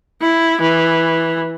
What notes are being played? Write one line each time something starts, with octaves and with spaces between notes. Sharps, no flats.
E4
E3